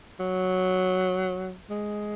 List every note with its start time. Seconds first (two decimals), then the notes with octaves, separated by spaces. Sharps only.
0.20 F#3
1.70 G#3